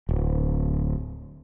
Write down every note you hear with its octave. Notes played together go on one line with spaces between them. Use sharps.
D1